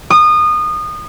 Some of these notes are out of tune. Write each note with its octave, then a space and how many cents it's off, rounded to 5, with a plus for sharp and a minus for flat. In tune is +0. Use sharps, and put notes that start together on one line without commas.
D#6 -25